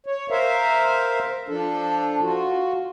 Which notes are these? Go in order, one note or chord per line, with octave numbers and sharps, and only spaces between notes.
C#5
A#4 C5 E5 F5
F3 D4 A4
F4 F#4